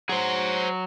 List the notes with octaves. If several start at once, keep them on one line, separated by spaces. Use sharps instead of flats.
F#3 G#4 C5